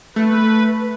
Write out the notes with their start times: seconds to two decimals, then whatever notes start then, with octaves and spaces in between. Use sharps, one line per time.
0.16 A3 B4